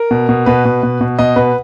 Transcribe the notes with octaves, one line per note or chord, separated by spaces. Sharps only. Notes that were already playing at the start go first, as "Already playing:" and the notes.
Already playing: A#4
B2
B2
B2 B4
B2
B2
B2
B2 D#5
B2 B4